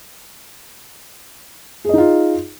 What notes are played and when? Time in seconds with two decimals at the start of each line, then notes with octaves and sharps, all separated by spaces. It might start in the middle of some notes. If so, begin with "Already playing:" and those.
1.85 G#4
1.89 D#5
1.94 D#4
1.98 F4